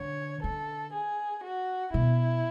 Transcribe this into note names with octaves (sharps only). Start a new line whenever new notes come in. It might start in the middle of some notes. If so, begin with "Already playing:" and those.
Already playing: D3 C#5
D3 A4
G#4
F#4
B2 E4